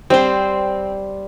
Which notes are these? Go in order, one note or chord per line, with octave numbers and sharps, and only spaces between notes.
G3 C4 C5